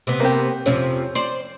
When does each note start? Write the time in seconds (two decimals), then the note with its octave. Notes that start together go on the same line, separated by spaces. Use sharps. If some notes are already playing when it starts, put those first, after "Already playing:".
0.07 C3 B3
0.20 A#3 C4 G4
0.66 F2 C3 F3 C#4
1.15 C5 D5